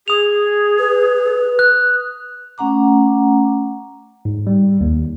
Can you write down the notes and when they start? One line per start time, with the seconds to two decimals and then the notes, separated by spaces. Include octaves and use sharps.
0.08 G#4 D#6 F7
0.79 B4
1.59 F#6
2.58 A3 C#4 F#5 A#5 D6
4.25 G#2
4.47 G3
4.81 D#2